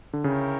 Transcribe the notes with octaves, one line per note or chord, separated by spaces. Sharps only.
D3
C#3 E4 A#4 C#5 G5